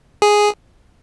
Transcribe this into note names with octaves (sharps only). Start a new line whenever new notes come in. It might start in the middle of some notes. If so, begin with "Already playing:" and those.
G#4